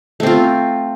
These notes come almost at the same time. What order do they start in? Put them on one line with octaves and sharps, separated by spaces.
A3 C4 F4